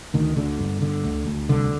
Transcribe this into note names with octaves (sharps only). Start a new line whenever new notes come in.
D2 D#3
D2 D3
G1
D3
D2
D2
C2 D3